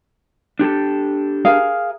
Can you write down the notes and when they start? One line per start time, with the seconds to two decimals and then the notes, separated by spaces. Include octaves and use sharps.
0.59 D4 G4 A4
1.45 G#4 A#4 F5